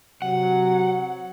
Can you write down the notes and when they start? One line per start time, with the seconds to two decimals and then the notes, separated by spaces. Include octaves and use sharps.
0.22 C3 F#3 F#5